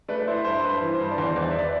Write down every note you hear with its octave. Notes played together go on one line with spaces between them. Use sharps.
A3 B4 D5
B4
E4 C5
B4
G2 C5
G2 B4
C5
E3
C5
G2
D5
E2 C5
E2
D5
E5
B4 D5